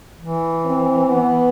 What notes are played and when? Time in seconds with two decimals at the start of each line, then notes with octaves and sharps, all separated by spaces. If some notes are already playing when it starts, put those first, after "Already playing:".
0.19 E3
0.65 C4
1.09 B3